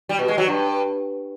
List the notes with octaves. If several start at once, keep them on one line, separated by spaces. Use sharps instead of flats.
G3
B2
G#3
F#3
G2